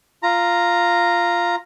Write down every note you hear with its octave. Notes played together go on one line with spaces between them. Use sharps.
F4 A#5